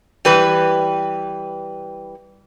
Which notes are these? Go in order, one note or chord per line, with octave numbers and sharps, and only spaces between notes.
E3 G3 B4